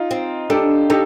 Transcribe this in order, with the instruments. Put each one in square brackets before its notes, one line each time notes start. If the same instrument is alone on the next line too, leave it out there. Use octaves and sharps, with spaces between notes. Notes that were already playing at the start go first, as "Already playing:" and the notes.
Already playing: [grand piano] D#4 F4
[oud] C4
[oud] D4 [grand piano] G4 A4
[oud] D#4 [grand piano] G4 A4